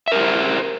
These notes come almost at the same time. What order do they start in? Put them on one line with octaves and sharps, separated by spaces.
E5 A#4 G4 C5